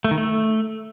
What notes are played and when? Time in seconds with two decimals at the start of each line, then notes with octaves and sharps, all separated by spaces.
0.04 A3
0.11 D#3
0.18 A3